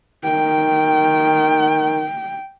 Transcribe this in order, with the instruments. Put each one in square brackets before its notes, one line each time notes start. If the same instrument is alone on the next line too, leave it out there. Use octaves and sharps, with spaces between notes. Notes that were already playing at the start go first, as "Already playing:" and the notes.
[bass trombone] D#3 [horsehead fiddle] G5